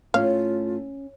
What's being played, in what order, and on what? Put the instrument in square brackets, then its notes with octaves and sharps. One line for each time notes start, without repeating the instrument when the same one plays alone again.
[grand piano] A2 A3 [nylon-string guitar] C#4 [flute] F4 [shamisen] F5